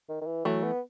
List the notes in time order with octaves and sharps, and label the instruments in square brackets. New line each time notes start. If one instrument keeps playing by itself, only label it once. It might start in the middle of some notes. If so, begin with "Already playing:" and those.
[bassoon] D#3
D#3
E3
[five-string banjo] E3 A3 [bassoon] F#3
[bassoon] B3